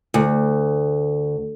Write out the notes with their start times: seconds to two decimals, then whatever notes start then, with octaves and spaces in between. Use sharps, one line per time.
0.14 D2